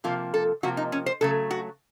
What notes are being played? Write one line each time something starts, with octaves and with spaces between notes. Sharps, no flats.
C3 F3 A#3 F4
A4
C3 F3 A#3 F#4
D#4
C#4
C5
C#3 F#3 A3 A4
F#4